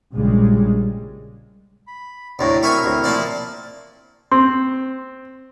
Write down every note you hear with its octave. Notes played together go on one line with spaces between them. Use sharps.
A#1 C#3 G3 G#3
B5
D2 A2 D5 A#5 D6
C4 E4 A#4 C#5 E5 G#5
D2
A#2 F3 D5
C4 C6